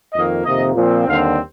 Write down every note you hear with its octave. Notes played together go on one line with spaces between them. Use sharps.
F2 D#3 A#3 D#5
F2 C3 D#3 A#3 D#5
A#2 F3 C4
D#2 D3 G3 C4 F5